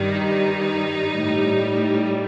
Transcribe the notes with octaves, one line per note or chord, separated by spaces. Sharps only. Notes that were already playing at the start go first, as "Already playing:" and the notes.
Already playing: G2 D#3 G3 D#4
A2 G3